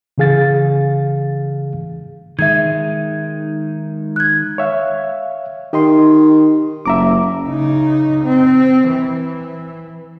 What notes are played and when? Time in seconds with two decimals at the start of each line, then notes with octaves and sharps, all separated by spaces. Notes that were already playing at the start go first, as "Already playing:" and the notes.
0.18 C#3 E3 G#4 F5 A6
2.39 D#3 G#3 E5 G#6
4.16 F#6 G#6
4.58 C#5 E5 F5
5.73 D#3 G4 D#5 C6
6.86 F#1 E5 A#5 D6
7.48 C#3 D#4
8.24 C4
8.88 E3